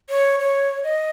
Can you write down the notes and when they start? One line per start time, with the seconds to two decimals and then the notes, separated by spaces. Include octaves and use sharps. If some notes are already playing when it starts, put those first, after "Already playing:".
0.09 C#5
0.40 C#5
0.84 D#5